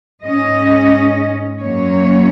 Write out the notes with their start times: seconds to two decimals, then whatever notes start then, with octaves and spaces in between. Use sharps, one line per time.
0.23 G#2 G#3 C#4 D#5
1.59 F#2 F#3 A#3 C#4 C#5